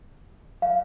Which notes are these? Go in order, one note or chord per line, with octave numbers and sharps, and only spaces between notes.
F5